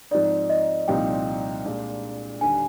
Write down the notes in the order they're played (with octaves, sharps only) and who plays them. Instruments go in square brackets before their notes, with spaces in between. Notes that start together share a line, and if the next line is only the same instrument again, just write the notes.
[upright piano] G#2 F3 C4 D#4 [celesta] D5
[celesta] D#5
[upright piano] C2 A#2 F3 C4 D#4 [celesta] G5
[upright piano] A#2 G#3 D4
[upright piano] D#2 D3 G3 [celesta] G#5